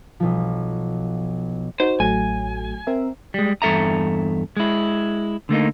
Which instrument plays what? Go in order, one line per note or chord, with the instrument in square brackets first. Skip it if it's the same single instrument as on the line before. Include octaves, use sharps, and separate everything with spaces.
[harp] B1 F3
[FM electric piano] D#4 F#4 [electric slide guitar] C5
[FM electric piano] A1 F#3 A3 [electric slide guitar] G#5
[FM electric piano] C4 A#4 E5
[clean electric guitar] G3 G#3
E2 G2 A4 E5 A#5
G#3 E4
D3 A3 A#3 D#4